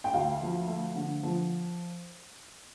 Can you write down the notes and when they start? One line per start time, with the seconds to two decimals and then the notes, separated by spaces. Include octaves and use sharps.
0.04 G5
0.13 D2 F5
0.41 F3
0.68 A3
0.96 D3
1.23 F3